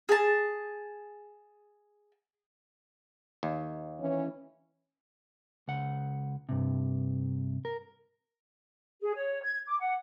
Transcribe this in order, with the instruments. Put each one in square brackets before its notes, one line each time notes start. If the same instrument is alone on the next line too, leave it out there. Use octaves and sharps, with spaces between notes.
[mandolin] G#4 A5
[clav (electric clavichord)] D#2
[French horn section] E3 C#4
[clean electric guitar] C#2 F#5
G2 C3
A#4
[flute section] G#4
C#5
G#6
D6
F#5